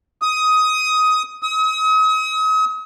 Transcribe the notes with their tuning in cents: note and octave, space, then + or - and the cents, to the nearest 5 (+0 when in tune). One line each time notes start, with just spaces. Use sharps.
D#6 +15
D#6 +40